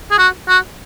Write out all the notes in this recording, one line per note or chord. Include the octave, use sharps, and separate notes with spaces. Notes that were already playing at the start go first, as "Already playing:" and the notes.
G#4
F#4
F#4